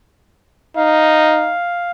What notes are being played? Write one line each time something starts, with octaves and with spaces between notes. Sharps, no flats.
D#4 F5